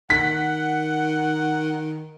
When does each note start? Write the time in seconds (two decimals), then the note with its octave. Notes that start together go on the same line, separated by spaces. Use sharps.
0.10 D#3 F#5 B6